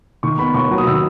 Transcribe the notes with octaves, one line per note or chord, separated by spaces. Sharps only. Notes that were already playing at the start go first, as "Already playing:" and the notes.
D#3 C#6
B3 B5
D#2 C#6
F#3
D#6
D#3 E6